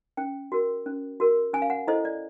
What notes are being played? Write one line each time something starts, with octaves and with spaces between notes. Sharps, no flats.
C#4 G5
F#4 A#4
C#4
F#4 A#4
C#4 G#5
F5
F#5
E4 A4 C5 D#5
D5